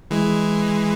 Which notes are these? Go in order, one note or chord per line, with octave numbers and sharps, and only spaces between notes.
E3 G#3